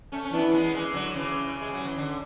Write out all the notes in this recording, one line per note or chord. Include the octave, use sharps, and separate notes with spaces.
A3 C#4
C#4
E3 B3 D4
G#3 B3
E3 G#3
D3 F#3
C#3 E3
G#3
F#3
E3
D3